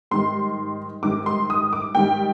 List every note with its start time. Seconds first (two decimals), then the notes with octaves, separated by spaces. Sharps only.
0.11 G#2 D#3 G3 C6
1.03 G#2 D#3 G3 D6
1.26 C6
1.50 D#6
1.73 D6
1.95 G#2 D#3 G3 G5